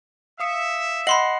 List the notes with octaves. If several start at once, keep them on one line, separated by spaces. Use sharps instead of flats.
E5 F5 D#6 C#7
D#5 F#5 B5 C6 C7 F#7